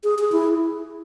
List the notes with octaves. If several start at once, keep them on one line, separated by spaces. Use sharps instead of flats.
G#4
G#4
E4